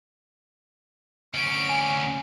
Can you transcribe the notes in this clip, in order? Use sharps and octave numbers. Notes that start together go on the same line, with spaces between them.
D2 C#4 D7
G#5